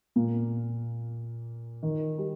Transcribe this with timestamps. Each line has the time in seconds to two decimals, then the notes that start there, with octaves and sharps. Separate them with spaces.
0.16 A#2 A#3
1.83 D#3
2.18 G3